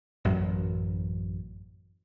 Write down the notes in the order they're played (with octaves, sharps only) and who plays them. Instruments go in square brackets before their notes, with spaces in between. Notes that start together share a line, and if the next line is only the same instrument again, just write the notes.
[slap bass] A1 F#2 F#3